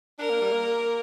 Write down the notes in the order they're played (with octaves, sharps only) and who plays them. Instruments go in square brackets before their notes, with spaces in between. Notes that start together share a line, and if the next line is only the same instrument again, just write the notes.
[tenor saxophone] D4 [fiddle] A#4
[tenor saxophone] A#3
G3
A#3